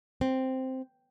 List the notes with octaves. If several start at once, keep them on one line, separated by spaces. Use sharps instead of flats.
C4